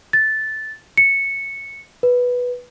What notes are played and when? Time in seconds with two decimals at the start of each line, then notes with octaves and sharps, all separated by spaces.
0.13 A6
0.97 C#7
2.03 B4